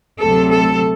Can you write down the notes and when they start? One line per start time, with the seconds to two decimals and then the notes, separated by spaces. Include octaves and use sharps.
0.21 D2 C3 F#3 A4
0.50 A4